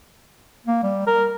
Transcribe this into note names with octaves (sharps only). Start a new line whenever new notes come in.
A#3
G3
A#4